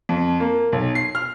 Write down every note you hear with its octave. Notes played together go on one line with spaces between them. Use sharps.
F2
A#3
B1
C7
F6